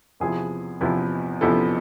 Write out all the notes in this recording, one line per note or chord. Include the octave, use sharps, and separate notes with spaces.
E2 C3 F3 B3 E4 G#4
E2 C3 F3 B3 E4
E2 C3 F3 B3 E4 A4